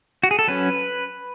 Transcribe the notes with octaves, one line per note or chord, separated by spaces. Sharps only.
F#4
G#4
A4
F#3 C#4 B4